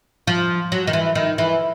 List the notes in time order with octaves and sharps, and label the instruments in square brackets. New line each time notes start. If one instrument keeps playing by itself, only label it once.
[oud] F3
F#3
D#3
E3
D#3
E3